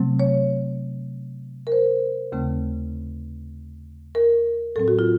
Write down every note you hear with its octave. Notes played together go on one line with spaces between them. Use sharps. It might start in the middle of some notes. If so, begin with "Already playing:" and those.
Already playing: C3 F#3 A3 C4
C#5
A#4
C5
D#2 C#3 A3 C4
A#4
A2 F#3 C4 A4
F#4
F4